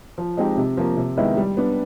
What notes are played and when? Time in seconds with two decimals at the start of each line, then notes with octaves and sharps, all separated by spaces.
0.18 F3
0.37 G#3 C4 D#4 G4
0.57 C3
0.77 F3 A#3
0.97 C3
1.17 D#3 G#3 B3 E4
1.37 G3
1.57 B3 D4